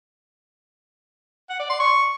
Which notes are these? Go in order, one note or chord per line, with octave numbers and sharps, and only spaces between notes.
F#5
D5
C6
C#6